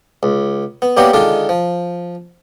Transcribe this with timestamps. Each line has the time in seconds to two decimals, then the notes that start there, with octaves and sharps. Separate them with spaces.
0.23 C#2
0.82 B3
0.97 G3 A#3 B3 C#4 F#4 G4
1.13 D3 D#3 G#3 D4 F4
1.49 F3